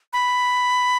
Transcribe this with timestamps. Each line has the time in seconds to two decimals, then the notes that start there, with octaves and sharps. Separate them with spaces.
0.13 B5